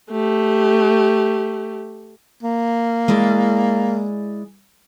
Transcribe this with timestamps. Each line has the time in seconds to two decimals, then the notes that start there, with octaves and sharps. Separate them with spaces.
0.11 A3 G4
2.43 A#3
3.08 G#3 E4 D5